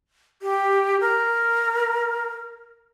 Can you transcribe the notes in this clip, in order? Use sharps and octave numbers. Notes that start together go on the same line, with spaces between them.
G4
A#4